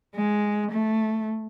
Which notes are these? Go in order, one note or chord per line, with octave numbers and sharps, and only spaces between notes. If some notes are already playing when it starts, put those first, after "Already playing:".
G#3
A3